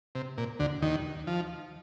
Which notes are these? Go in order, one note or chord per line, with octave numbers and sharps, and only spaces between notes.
C3
A#2
D2 D3
D#2 D#3
F3